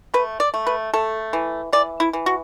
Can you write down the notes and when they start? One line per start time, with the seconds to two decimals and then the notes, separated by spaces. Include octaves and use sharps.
0.14 A3 B4
0.40 D5
0.54 A3
0.67 B4
0.94 A3 A4
1.33 E3
1.73 E3 D5
2.00 E4
2.13 E3
2.26 F#4